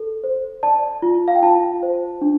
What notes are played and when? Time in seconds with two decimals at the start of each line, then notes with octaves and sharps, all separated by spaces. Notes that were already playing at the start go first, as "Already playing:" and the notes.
Already playing: A4
0.24 C5
0.63 D5 A5
1.02 F4
1.28 F5
1.35 G5
1.42 F4 A5
1.83 C5
2.21 D4